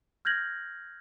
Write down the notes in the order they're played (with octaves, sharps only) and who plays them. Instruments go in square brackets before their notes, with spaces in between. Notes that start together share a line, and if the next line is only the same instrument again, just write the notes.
[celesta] F6 G6 G#6 A#6 F#7